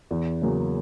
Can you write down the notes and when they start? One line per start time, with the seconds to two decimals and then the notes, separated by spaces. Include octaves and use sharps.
0.11 E2
0.42 C#3 F#3 A#3 C#4